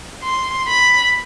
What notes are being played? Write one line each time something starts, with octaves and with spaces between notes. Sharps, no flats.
C6
B5